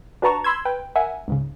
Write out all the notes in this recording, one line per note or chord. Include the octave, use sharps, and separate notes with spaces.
D4 F#4 B4 A5 A#5 C#6
B5 C6 E6 G#6
B4 G5
A#4 E5 F#5 G#5
C#2 G#2 C#3